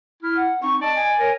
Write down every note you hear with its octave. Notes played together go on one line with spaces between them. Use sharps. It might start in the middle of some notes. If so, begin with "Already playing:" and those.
E4 F6
F#5
C4 D#4 C#6
D5 D#5 A5
G#5
A#4 C#5